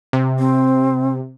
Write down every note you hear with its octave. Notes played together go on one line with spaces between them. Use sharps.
C3
C4